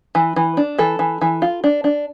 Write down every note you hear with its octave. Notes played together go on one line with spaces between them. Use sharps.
E3
E3
D4
E3 A4
E3
E3
F4
D4
D4